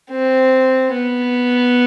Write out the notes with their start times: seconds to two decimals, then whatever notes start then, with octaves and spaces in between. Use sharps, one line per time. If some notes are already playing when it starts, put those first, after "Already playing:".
0.11 C4
0.94 B3